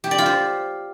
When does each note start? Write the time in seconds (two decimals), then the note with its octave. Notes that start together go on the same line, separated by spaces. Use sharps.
0.04 G4
0.11 D5
0.18 F4
0.26 C5